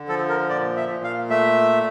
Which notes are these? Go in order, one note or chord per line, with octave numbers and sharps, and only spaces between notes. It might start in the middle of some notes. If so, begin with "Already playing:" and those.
Already playing: D3
F3 A4
A#4
A#2 D5
E5
A#2
F5
A3 E5